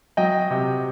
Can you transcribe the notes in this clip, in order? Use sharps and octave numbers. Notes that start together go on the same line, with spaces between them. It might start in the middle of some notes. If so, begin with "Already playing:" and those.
F#3 D#5 G5
C3